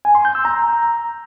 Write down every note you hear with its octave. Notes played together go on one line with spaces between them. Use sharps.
G#5
C6
G6
E6
A#5